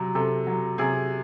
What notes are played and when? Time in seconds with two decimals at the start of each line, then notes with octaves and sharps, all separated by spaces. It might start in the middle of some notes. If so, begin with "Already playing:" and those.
Already playing: C3 F#3
0.15 C3 A4
0.47 F#3
0.78 C3 G#4